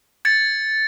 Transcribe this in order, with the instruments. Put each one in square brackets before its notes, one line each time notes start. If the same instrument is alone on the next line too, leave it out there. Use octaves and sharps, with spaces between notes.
[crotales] G#6 A6 C#7